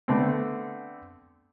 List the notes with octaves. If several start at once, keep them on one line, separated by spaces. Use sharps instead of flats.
D3 A3 B3 C4